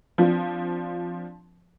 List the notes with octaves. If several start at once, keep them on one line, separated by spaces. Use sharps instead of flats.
F3 C4 D4 F4